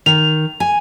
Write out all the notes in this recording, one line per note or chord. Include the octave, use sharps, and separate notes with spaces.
D#3 F7
G#5